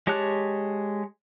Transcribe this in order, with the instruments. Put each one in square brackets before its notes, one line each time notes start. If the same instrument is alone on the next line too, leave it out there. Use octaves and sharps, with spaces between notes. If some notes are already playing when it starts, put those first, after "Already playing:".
[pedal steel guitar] G#3 G4 C#5 A5 F#6